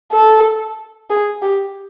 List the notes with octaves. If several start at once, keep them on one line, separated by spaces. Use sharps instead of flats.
A4
G#4
G4